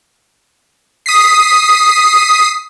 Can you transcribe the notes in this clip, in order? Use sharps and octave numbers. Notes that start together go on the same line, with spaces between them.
D#6 B6 C7